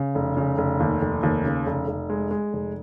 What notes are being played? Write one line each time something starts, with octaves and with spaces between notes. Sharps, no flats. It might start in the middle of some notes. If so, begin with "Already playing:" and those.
Already playing: C#3
F1
C#3
F1
D#2
F1
D#2
C#3
F1
F1
G#3
G#3
F1